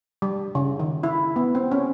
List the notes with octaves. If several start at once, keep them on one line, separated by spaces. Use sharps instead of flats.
G3
C#3
D#3
E4
B3
C4
C#4